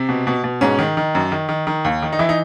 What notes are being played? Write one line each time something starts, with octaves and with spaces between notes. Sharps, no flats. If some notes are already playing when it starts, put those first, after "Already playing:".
Already playing: C3 C4
B2
B2
B2
G#2 C#4
D#3
D#3
F#2
D#3
D#3
D#3
D#2
D#3
D#4
E3 E4
D#4